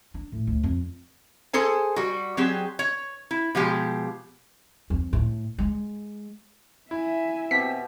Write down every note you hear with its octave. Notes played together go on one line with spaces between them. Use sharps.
D4
A2
D2
F2
G#4 A4 C5 G#5
G3 F#4
F#3 C4 G4 G#4
C#5
E4
B2 F3 G#3 G4
F2
A2
G#3
E4 E5 G#5
B2 C4 G4 B6